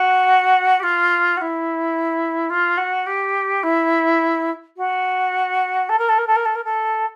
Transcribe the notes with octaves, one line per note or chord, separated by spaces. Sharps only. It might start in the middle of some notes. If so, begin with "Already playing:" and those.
Already playing: F#4
G4
F4
F#4
E4
F4
F#4
G4
E4
F#4
A4
A#4
A4
A#4
A4
A#4
A4
A#4
A4